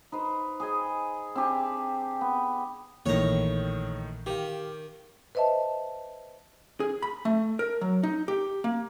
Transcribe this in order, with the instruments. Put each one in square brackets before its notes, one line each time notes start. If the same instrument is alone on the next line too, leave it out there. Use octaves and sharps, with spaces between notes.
[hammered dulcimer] D#4 B4 C5
G#4 D#5 G#5
C4 D4 G4 G#5
B3
[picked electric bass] A#1 E3 A#3 [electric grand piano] A2 D#3 [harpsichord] C#5 A#5
[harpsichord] D#3 [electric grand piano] G4 F5
[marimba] B4 C5 D#5 E5 A5
[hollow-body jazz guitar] G#4
B5
A3
A#4
F#3
D#4
G4
A#3